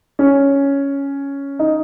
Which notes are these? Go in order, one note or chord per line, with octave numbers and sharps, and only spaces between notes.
C#4
D#4